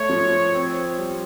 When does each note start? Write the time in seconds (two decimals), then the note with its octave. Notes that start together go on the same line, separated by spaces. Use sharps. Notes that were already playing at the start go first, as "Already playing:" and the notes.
Already playing: A3 C#5
0.09 F3
0.54 C4
0.98 G3